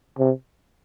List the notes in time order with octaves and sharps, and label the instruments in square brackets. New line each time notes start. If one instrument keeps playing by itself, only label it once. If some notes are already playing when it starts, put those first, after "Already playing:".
[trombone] C3